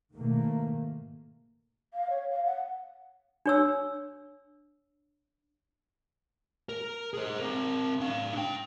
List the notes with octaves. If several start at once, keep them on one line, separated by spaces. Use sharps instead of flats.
G#2 B2 D#3 A3 A#3
F5
C#5
F5
F#5
D4 C#5 E6
A#4
G#4 C5
C4 A#4
D4 F5
D4 G5